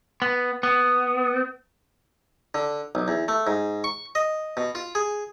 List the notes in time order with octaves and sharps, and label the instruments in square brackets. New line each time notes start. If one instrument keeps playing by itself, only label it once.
[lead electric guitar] B3
B3
[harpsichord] D3
B1
E2
A3
G#2
C#6
D#5
B2
F4
G#4